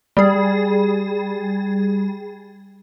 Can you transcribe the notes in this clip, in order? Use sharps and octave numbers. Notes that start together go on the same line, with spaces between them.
G3 G#4